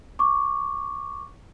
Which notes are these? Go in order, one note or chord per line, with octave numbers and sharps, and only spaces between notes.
C#6 D6